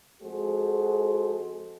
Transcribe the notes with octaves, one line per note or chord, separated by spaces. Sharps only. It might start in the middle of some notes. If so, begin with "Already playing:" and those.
F2 G#3 F#4 G#4 A4 C5